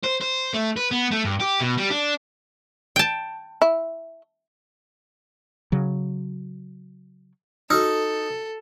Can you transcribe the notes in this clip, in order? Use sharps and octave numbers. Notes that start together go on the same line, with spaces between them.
C5
C5
A3
B4
B3
A3
G2
G4
B2
G3
D4
G5 A5
E4
C#3 F#3
D#4 F#4 A4 E6 F6